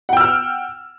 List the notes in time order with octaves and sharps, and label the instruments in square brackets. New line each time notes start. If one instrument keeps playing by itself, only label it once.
[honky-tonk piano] F#5
G5
E6
F6